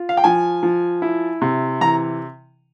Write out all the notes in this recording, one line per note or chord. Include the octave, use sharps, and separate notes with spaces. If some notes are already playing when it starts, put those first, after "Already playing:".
Already playing: F4
F5
G5
F3 G#5
F3
E4
C3
E3 A#5